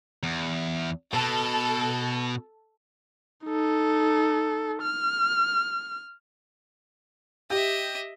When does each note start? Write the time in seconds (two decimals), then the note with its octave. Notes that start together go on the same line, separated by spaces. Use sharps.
0.23 E2
1.14 B2 A4
3.45 D#4 A4
4.82 F6
7.50 G4 D#5 E5